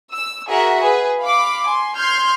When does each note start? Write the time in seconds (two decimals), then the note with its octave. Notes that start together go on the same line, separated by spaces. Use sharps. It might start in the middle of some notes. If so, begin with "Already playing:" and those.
0.11 E6
0.48 F#4 G#4 A#4 E5 F#5
0.82 G#4 B4
1.21 F5 B5 D6
1.66 G#5 C6
1.96 C6 F6 G6 G#6